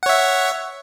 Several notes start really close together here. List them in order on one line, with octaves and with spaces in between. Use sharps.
F#5 C#5 E5